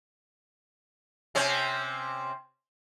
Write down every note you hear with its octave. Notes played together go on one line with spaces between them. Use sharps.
C3 C4 C#4